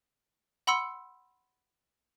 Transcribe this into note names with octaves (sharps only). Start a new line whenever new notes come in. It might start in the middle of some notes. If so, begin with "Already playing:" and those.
F#5 B5 C6 E6 C#7